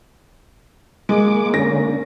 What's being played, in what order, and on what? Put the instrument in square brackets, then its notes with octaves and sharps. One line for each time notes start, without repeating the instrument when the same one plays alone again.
[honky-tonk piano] G#3 [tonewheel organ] A#3 D6
[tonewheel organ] D3 A#3 C#4 [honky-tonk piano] A#6